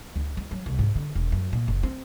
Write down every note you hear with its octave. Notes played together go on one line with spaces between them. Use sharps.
D2
G#3
F#3
C2
G#2
D3
E1
F#2
A#2
F#1
C4